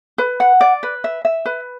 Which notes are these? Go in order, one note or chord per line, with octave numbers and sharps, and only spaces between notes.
B4
F#5
D5
B4
E5
E5
B4